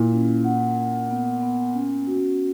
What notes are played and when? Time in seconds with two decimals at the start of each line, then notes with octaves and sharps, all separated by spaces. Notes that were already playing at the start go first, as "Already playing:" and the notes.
Already playing: A#2 E4
0.12 C#4
0.44 F#5
0.77 F#5
1.10 B3
1.42 B3
1.74 C#4
2.07 F#4